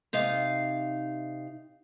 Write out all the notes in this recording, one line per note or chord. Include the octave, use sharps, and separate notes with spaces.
C3 D#4 F5